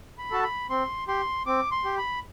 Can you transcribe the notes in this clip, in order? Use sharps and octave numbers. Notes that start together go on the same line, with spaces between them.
B5
F#4 A4 A5
B5
C4 C6
G4 C6
C4 D6
C6
G4
B5